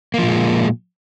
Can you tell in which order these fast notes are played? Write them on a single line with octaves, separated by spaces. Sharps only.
A#3 F3 A#2 G#3